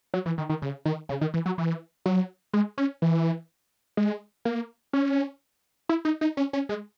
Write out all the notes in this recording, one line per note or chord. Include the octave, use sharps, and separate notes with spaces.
F#3
E3
D#3
D#3
C#3
D#3
C#3
D#3
E3
F#3
E3
F#3
G#3
C#4
E3
G#3
A#3
C#4
E4
D#4
D#4
C#4
C#4
G#3